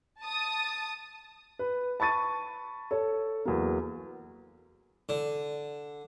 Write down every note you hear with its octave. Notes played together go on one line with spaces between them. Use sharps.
A5 D#6
B4
A5 B5 C#6 A6 D#7
A4 C#5
E2 F#3 A#3
D3